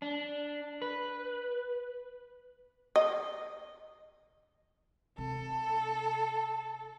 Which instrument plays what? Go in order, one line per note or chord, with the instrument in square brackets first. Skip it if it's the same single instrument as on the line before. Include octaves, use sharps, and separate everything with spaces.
[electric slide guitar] D4
B4
[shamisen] D#5
[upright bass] C3 [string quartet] A4